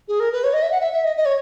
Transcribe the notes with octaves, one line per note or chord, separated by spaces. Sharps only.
G#4
A#4
B4
C#5
D#5
E5
F#5
E5
E5
D#5
D#5
C#5